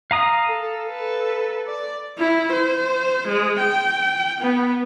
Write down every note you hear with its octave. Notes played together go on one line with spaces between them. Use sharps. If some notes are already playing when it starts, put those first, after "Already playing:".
F5 A#5 D#6
A4
A4 B4
D5
E4
C5
G#3
G5
B3